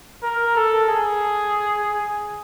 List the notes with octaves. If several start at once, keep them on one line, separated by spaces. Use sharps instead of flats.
A#4
A4
G#4